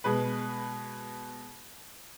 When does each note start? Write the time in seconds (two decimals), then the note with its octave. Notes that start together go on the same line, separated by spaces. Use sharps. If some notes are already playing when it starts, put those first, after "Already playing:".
0.04 B2 G#3 B4